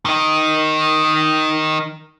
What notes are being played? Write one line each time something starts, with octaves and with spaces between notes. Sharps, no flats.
D#3 D#4